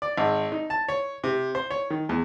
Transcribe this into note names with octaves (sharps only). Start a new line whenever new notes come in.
D5
G#1
D#4
A5
C#5
C3
C5
C#5
D#3
E2